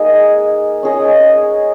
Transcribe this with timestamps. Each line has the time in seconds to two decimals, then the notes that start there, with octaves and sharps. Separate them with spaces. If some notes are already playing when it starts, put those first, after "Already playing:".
Already playing: A#3 D#4 G#4
0.83 C#4 G#4 D#5